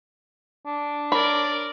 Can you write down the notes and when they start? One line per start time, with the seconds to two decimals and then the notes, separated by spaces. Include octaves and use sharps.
0.66 D4
1.12 A#4 C#5 D5 B5